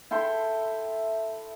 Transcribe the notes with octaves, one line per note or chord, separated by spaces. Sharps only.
E4 A4 G5 C6